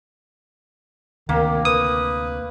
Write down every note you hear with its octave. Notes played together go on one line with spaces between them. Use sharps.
D2 C3 D#3 A#3
B4 D#6